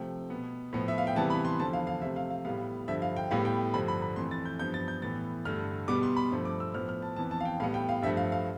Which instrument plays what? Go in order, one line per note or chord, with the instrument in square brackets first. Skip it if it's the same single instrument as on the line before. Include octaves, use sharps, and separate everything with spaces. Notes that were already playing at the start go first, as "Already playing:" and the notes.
Already playing: [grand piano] C3 F3 A3 G5
B2 B3
A2 F3 B3
E5
F5
G5
C3 E3 G3 B3 A5
B5
C6
E2 D3 F3 A5
F5
F5
C3 F3 A3 E5
F5
F5
A2 G3 B3 F5
G2 D3 F3 E5
F5
G5
A2 G3 B3 F5
G5
G2 D3 F3 B5
B5
B5
F2 E3 A3 C6
A6
G6
G2 F3 B3 G6
A6
G6
A2 E3 B3 A6
G2 D3 A3 F6
B2 G3 B3 D6
C6
B5
G2 F3 A3
D6
E6
A2 F3 B3 F6
F6
A5
F2 E3 B3 A5
A5
F5
G5
A2 G3 B3 F5
G5
F5
G2 F3 A3 E5
F5
F5